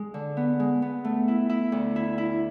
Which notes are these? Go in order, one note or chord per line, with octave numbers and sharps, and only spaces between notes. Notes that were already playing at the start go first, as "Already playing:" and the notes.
Already playing: G#3
D3
B3
G#3
B3
A3
E4
E4
D2
E4
E4